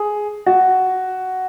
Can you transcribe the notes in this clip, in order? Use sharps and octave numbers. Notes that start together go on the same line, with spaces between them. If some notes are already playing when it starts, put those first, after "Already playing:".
Already playing: G#4
F#4